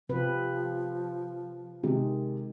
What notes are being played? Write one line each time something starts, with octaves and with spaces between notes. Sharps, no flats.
C3 F3 C4 B4
C3 D#3 G#3